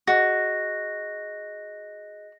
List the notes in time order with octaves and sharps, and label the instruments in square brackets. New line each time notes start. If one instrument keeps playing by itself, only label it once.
[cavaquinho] F#4 [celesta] G#4 D#5 F#6 [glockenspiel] A#6